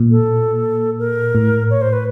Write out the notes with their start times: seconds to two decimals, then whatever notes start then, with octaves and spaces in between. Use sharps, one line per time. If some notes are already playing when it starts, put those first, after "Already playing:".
Already playing: A#2
0.11 A4
0.99 A#4
1.35 A2
1.70 C#5
1.82 C5
1.93 B4